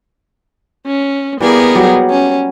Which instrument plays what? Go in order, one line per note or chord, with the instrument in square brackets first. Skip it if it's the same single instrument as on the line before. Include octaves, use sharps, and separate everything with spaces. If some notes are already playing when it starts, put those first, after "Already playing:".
[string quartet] C#4
[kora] E3 G3 A#3 [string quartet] B3 G#4 A#4
[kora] F#3 G3
[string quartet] C#4